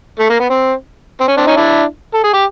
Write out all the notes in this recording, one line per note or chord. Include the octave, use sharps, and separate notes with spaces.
A3
A#3
B3
C4
C4
C#4
C4 D4
C#4 D#4
D4 E4
A4
G#4
G4